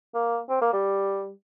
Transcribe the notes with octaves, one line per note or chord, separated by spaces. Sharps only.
A#3
C4
A#3
G3